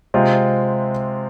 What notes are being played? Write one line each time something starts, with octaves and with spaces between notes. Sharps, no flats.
C3 G#3 C4 F4